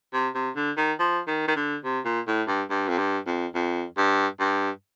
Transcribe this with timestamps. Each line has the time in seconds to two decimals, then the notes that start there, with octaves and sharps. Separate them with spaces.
0.13 C3
0.35 C3
0.56 D3
0.77 D#3
0.99 F3
1.27 D#3
1.48 D#3
1.56 D3
1.84 C3
2.05 A#2
2.27 A2
2.48 G2
2.70 G2
2.88 F2
2.98 G2
3.26 F2
3.55 F2
3.97 G2
4.40 G2